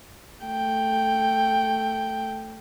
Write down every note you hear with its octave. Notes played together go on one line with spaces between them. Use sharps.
A3 G5